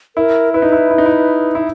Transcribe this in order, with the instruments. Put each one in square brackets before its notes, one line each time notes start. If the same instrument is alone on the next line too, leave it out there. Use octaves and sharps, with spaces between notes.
[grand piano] E4 [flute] A#4
[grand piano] E4 [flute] B4
[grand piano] D#4
E4
E4
D#4
E4
E4